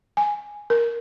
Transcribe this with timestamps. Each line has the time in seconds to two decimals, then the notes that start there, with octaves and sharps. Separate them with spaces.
0.17 G#5
0.70 A#4